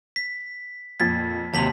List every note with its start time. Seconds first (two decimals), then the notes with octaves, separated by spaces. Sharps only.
0.16 B6
1.00 F2 A#2 G#6 A6 B6
1.54 D#2 C3 F#3 A5 B6 F#7